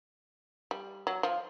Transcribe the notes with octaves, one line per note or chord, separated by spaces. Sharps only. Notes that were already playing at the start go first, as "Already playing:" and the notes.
G3
F#3
F3